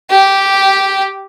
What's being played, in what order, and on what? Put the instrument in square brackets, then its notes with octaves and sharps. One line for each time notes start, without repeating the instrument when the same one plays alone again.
[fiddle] G4